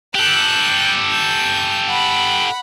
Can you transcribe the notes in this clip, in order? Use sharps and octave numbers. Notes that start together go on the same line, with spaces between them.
G4 A4 F#6 G6
G6
F#5 B5